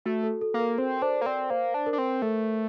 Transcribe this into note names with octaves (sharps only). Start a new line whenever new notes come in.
A3 F#4
A4
A4
A#3
A#4
C4 C5
D4 C5
A#3
C4 D5
A#3 C5
D4
A#4
D4
C4
A3 A4